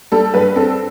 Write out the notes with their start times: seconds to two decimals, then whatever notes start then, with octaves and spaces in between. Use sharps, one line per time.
0.12 G3 A4
0.34 G2 B4
0.56 C4 A4